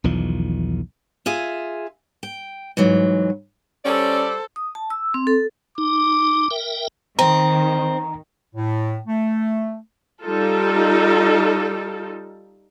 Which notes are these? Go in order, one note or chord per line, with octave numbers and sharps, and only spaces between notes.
B1 E2 D#3 F3
F4 G#4 E5 G#5
G5
G#2 E3 F#3
G3 C#4 A4 C5 D5
D#6
A5
E6
C4
A4
D#4 D6
A#4 E5 G5
D#3 C4 A#5
A2
A3
G3 D#4 F4 A4